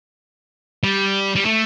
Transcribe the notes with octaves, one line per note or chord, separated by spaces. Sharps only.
G3
G3
A3